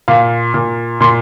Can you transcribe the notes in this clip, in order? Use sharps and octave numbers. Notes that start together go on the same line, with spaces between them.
A#2 F5
A#2
A#2 C6